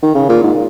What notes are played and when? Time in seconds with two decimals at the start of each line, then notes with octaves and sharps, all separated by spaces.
0.03 D#3
0.14 C#3
0.29 A#2
0.43 G#2